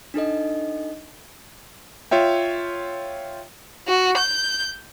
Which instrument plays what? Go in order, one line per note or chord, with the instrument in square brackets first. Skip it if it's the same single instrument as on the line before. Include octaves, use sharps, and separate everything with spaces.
[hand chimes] D4 D#4 A4 D#5
[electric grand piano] F4 C#5 E5 G5
[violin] F#4
G6